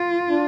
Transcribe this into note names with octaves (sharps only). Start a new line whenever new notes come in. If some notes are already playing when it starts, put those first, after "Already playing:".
Already playing: F4
D4